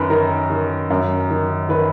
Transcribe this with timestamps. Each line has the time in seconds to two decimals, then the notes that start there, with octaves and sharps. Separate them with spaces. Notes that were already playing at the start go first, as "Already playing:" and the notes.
Already playing: F#2 D#3 A#4 B4
0.10 D#3 A#4
0.50 D#3
0.90 F#2
1.30 D#3
1.69 D#3 B4